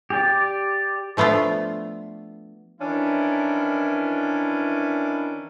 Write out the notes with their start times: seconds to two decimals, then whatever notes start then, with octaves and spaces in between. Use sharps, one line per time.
0.10 G4 D5
1.17 F3 A3 B3 D4 F4
2.81 D#3 E3 C#4 D4 E4